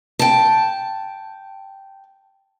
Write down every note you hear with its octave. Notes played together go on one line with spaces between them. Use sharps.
G5 A5